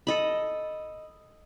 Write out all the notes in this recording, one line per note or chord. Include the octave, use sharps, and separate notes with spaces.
A4 D#5 B5